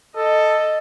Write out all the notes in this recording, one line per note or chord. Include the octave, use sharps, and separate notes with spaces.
A4 D#5